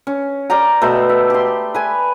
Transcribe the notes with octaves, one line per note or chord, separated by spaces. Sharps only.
C#4
A#4 D5 G5 A#5
B2 A3 C5 E5
E5
G4 C6
B4 G#5